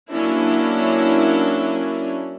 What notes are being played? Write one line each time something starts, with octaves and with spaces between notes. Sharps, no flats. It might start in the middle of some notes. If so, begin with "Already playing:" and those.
F#3 A#3 C#4 D4 E4